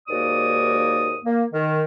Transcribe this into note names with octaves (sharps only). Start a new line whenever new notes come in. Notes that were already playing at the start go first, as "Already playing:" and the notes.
D#2 G#2 A#3 F#4 D5 D#6
A#3
D#3